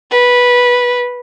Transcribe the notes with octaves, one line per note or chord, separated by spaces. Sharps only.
B4